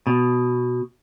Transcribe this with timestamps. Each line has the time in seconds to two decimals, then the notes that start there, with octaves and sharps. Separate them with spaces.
0.07 B2